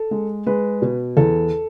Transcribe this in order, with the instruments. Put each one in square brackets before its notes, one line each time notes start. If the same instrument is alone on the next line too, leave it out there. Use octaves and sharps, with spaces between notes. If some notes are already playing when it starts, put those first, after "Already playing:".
Already playing: [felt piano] A4
G#3
G#3 B4
B2
E2 A4